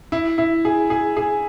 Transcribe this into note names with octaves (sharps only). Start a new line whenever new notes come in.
E4
E4
G#4
G#4
G#4